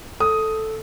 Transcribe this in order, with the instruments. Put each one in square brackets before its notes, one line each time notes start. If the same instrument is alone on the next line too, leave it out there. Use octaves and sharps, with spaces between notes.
[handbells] A4 [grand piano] D#6